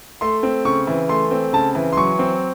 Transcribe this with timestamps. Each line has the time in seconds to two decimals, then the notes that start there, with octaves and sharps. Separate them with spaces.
0.21 A3 C6
0.43 C4
0.65 C#3 C#6
0.87 E3
1.09 A3 C6
1.31 C4
1.53 C#3 A5
1.75 E3
1.93 C6
1.97 F#3 C#6
2.19 C4